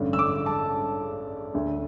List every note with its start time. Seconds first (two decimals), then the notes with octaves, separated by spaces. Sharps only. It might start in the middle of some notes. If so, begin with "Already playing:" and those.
Already playing: A1 G2 D3
0.13 E6
0.19 D6
0.46 A5
1.54 D2 D3 A3